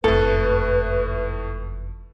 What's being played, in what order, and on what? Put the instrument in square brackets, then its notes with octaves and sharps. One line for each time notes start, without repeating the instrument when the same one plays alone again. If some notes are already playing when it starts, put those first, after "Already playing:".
[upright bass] F#1 F2 [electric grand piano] A2 A3 [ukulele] A4 [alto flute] B4